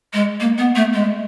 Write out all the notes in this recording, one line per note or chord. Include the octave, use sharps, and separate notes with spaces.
G#3
A#3
B3
A3
G#3